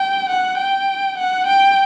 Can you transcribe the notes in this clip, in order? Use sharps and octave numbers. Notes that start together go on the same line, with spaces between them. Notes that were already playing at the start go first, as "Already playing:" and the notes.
Already playing: G5
F#5
G5
F#5
G5